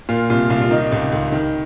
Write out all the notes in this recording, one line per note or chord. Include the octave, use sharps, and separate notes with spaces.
A#2 F4
C2 F4
C2 F4
F4
D#3 D#4
C#2
C#2
D#3